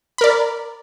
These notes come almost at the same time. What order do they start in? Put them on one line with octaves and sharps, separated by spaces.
B5 A#4 D5